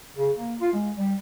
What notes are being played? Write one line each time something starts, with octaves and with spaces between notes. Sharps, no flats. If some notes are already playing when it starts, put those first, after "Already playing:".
C#3
A#3
F4
G#3
G3